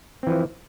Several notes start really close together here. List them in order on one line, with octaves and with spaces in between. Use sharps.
C4 E3 F3